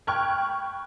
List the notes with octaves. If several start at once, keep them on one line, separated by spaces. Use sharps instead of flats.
G5 B5 C#6 F6 F#6 G#6